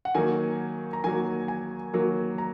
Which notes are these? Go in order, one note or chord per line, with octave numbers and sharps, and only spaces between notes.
F#5
D#3 F#3 A#3 G#5
A#5
D#3 F#3 A#3 G#5
G#5
D#3 F#3 A#3
A#5